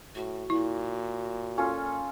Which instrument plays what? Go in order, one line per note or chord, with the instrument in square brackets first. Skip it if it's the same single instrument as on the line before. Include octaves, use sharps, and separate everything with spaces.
[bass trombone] A2 [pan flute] F#4
[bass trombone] A#2 [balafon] E4
[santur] C#4 F4 A4